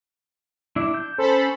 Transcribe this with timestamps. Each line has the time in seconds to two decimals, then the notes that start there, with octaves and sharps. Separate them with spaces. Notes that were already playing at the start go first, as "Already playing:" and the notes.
0.76 D4 E4
0.94 G6
1.18 C#4 A4 C5 B5